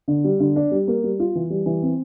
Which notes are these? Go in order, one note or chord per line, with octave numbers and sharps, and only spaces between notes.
D3
G3
D3
D4
G3
A#3
G3
F4
E3
G3
E3
C4